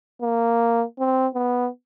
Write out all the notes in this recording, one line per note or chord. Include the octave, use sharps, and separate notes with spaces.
A#3
C4
B3